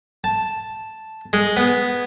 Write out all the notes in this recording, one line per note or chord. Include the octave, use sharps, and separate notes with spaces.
A5
G#3
B3